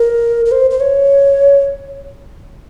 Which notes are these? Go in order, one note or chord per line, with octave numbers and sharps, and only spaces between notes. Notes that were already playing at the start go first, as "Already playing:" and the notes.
Already playing: A#4
A#4
C5
C5
C#5